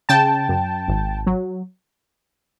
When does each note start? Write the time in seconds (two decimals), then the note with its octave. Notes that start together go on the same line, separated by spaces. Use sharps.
0.09 C#3 G5 A5
0.49 F#2
0.88 G#1
1.27 F#3